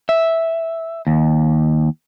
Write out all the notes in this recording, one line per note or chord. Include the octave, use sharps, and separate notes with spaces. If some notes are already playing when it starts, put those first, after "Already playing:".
E5
D#2